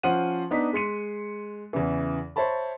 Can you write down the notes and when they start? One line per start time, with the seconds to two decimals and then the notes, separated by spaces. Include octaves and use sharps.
0.03 F3 C#4 C5 F#5 D#7
0.51 B3 D4 D#4 B6
0.73 G#3 C6 C#7 D#7
1.73 E2 C#3 E3
2.36 C5 C#5 E5 A5 B5